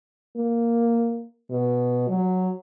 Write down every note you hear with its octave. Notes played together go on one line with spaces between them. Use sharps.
A#3
B2
F#3